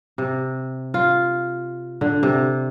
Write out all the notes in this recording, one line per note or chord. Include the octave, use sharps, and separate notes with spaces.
C3
F4
D3
C3